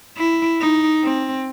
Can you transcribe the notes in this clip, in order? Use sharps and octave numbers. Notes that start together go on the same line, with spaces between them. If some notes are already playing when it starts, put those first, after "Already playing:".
E4
D#4
C4